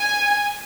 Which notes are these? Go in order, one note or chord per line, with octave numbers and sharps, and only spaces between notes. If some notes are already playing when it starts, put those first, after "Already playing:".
Already playing: G#5